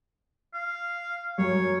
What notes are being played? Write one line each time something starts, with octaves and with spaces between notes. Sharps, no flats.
F5
F#2 C#5